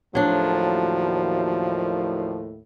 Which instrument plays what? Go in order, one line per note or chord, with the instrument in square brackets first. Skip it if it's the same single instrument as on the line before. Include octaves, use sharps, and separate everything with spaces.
[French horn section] D#2 A2 [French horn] F3 [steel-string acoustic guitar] F#3 D4